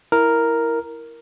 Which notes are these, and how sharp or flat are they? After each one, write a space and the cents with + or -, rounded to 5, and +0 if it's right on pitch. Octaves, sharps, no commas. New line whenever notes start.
E4 +0 A#4 +0